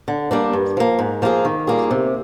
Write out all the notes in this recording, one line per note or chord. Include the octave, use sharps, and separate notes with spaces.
D3
G3 A#3 D4
G2
F3 A#3
G#2
F3 A#3 F4 G#4
D#3
G3 A#3 F4 G#4
C3